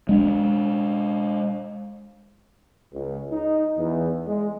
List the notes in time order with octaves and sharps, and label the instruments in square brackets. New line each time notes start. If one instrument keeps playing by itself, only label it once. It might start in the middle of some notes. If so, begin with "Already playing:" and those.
[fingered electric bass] G#3 D4
[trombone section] C#2
D#4
E2
G#3